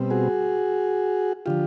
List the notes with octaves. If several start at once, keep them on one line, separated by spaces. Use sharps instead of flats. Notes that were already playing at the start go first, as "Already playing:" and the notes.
Already playing: B2 G3 C4
F#4 G#4
D3 F3 F4 G4